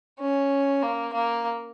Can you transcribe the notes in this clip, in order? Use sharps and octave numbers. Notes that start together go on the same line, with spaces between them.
C#4
A#3
A#3